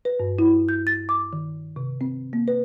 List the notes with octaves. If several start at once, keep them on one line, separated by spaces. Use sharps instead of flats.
B4
G2
E4
G6
A6
D6
D#3
C3
C4
A#3
B4